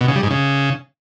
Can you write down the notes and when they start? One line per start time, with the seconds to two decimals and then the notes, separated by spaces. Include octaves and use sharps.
0.01 B2
0.08 C#3
0.16 G3
0.23 G#2
0.31 C#3